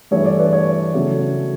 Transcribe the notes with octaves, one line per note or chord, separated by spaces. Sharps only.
G2 E3 A3 E4 C#5
D5
B4
C#5
C#3 F#3 A3